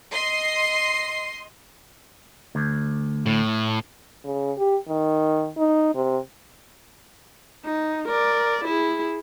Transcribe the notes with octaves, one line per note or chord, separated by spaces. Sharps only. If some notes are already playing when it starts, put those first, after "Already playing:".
D#5 C6 C7
D2
A2
C#3
G4
D#3
D#4
C3
D#4
A#4 D5
E4 G#4